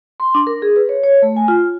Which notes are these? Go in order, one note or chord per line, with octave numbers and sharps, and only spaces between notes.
C6
D4
A#4
G#4
B4
C#5
C#5
A3
G#5
F4